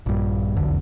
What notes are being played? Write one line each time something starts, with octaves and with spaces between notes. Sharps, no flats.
A#1 G2
F1 B1 E2 D3